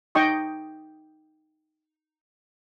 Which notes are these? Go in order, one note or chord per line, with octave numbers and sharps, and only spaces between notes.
D#4 D#5 G5 C#6 D#6